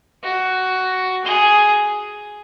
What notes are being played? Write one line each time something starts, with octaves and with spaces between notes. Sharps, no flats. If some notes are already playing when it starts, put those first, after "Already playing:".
F#4
G#4